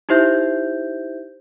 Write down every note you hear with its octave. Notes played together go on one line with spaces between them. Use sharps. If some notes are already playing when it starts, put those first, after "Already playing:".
D#4 E4 G4 C5 E5 G6